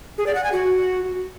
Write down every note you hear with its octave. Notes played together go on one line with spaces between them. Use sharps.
G#4
D5
F#5
G#5
F#4